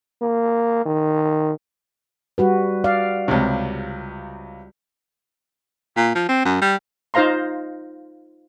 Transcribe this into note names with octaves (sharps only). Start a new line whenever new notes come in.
A#3
D#3
G3 F#4 B4
D5 F5
C#2 C3
A#2
F3
C4
F#2
G3
D#4 F4 C5 F5 A#5 C6